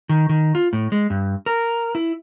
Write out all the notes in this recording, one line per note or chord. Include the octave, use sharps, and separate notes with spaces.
D#3
D#3
F4
A2
G#3
G2
A#4
E4